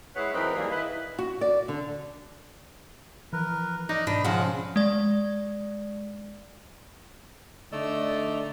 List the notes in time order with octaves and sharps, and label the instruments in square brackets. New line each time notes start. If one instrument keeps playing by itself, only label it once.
[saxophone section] G#3 E4 G#4 B4 C#5 F#5
E3 F#3 C4 D#4 A#4 B4
D#3 E3 G3 A#3 G#4
E4 B4 D#5
[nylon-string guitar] F#4
D5
D3
[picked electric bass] E3 F3 [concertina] A#4 B4
[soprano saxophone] D#4 [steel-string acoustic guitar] D5 [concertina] D#5
[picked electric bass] G#2 B2 [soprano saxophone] D4 [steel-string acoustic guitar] B4
[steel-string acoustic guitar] C#3 F3 [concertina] G#3 F5 [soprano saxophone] F#5
[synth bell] G#3 D5
[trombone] D3 [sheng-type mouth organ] A3 D5 E6 [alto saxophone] D#4